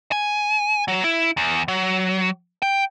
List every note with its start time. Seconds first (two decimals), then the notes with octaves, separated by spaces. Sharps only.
0.12 G#5
0.88 F#3
1.04 E4
1.37 E2
1.68 F#3
2.62 G5